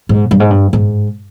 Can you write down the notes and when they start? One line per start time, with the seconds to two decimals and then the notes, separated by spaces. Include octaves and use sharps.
0.09 G#2
0.31 G2
0.40 G#2
0.50 G2
0.73 G#2